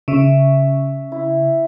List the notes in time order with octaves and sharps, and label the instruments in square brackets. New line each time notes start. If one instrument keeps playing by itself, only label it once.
[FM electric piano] C#3 [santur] E5
[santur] E4